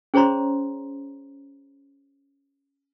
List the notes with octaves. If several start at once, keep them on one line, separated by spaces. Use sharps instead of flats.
C#4 G#4 C5 C#5 A#5 C6